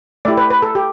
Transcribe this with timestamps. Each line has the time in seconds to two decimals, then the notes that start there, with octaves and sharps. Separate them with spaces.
0.25 A3 E4 G4 D5
0.37 B4
0.50 B4
0.62 A4
0.75 G4